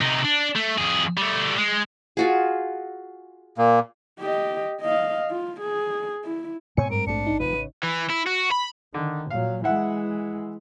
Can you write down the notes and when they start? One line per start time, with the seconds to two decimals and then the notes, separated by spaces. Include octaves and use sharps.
0.01 C3 D#4
0.25 D4
0.56 A3
0.78 F2 G#4
1.17 G3 A3
1.58 G#3
2.17 F4 F#4 G#4
3.58 A#2 A#3
4.19 G4 D#5
4.81 D#5 F5
5.31 F4
5.61 G#4
6.25 E4
6.77 G#2 B2 C4 C#5 G#5 C#7
6.91 G2 A#4 D7
7.07 A#1 A3 D4 C#7
7.27 A1 D#4
7.40 F1 F3 B4 D#7
7.53 C#3
7.83 E3
8.10 E4
8.26 F#4
8.52 B5
8.94 D3 D#3
9.30 A#2 F#3 F5
9.64 E3 G#3 E4 F#5